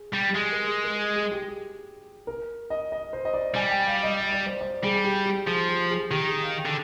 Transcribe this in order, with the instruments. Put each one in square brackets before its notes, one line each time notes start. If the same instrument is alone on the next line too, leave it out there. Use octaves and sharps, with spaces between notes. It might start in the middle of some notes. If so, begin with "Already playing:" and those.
Already playing: [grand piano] G#4
[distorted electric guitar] G3
[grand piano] G4
[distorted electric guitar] G#3 [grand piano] G#4
[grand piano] A#4
G#4
A#4
G#4
G#4
G4
G#4
A#4
D#5
D#5
C5
D#5
D5
[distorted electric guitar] G3 [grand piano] G#5
[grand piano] G5
F5
D#5
D#5
D5
C5
D5
[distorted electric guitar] G3 [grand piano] G#4
[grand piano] G#4
G4
G4
[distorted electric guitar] F3 [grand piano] G#4
[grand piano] G4
G#4
[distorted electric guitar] D#3 [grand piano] G4
[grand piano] G#4
F5
G5
[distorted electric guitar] D3